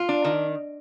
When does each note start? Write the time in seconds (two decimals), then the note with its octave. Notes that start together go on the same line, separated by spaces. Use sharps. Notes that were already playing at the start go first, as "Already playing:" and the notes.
Already playing: F4
0.09 D4
0.24 D#3